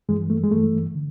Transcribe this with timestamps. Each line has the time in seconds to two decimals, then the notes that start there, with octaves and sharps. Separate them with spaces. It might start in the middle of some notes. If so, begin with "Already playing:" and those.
0.09 G2 E3 G#3
0.30 A3
0.44 G#3
0.51 G2 E3 A3
0.95 D3